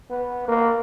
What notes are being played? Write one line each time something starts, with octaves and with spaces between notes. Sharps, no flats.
B3
A#3